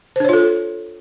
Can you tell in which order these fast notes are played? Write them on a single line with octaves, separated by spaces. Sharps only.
C5 D4 C#5 F4 A4